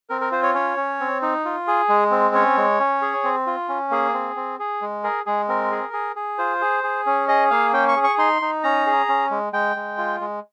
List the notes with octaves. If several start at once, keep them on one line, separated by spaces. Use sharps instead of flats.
C4 A#4
A#4
F4 C5
C#5
C#4 C#5
C#4
C4
D#4
F4
G#4
G#3
C4
C#4 C#5
G#3
C#4
G#4
C4
F4
C#4
A#3 G#4
C4
C4
G#4
G#3
G#4 A#4
G#3 G#4
C4 A#4
G#4
G#4
G#4
F4 C5
G#4
G#4
C#4
G#4 D#5
A#3 F5
C#4 G5
C#6
G#4
C#6
D#4 C6
D#4
C#4 A#5
G#4
C#4
G#3
G#3 G5
G#3
F4
G#3